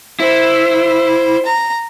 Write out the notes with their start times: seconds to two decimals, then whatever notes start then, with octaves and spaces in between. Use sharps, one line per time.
0.20 E4 C5
1.45 A#5